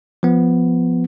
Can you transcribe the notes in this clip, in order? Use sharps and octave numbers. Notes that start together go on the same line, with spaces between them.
F3 B3